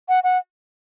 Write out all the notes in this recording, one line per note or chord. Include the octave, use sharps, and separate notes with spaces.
F#5
F#5